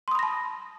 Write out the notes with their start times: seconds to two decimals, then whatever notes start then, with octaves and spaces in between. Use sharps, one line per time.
0.08 C6
0.11 D#6
0.15 B5
0.19 A#6
0.23 A5